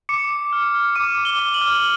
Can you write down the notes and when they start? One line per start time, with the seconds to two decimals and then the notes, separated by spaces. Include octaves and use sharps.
0.09 D6 C#7
0.31 D6
0.53 F6
0.74 F6
0.96 D6 D#7
1.18 D6
1.25 G7
1.39 D6
1.54 F#7
1.61 F6